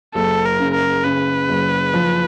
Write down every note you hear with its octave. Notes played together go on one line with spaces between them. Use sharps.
F#1 A4
A#4
C#3
A#4
C#3 B4
F#1
F3